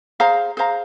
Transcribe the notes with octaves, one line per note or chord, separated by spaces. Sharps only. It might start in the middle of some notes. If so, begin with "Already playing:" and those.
G#4 C5 F5 A#5
G#4 C5 F5 A#5